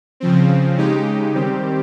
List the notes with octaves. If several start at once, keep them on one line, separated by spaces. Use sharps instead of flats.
C#3 F3 C4
C#3 G#3 D#4 G4
D#3 G3 C4 G4